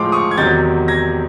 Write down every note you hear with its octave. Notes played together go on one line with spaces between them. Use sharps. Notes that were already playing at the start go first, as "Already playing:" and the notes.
Already playing: A2 F3 G#3 C6 D6
C#6 D#6
G#6
E2 C3 D#3 F#3 G6 A6
G#6 A#6